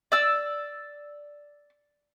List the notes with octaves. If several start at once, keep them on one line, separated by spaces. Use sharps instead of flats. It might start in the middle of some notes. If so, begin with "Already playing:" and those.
D5 E6